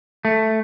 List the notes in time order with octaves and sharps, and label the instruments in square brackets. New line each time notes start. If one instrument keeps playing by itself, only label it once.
[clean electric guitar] A3